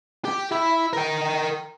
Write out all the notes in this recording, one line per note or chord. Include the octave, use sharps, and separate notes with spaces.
G4
E4
A#4 G5